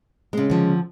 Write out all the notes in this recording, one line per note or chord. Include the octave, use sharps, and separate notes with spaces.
C#3 G#3 C4
D3 F3